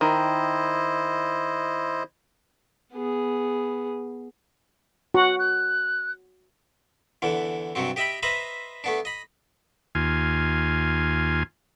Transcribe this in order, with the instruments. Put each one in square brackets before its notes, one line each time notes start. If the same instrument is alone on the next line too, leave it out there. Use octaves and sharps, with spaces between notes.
[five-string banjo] D#3 [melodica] E4 C5 D#5
[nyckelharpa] B3 G#4
[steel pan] F#4 [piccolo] F#5
[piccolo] F#6
[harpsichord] E2 D3 E3
G2 C3 F#3 C4
G4 D#5 E5 G5 B5
B4 C5 D#5 E5 A#5 B5
A3 B3 D4
D#5 B5
[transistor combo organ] D#2 F4 G#5